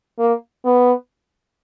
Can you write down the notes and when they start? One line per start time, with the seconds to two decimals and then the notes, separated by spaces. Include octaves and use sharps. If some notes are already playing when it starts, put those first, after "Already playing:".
0.19 A#3
0.65 B3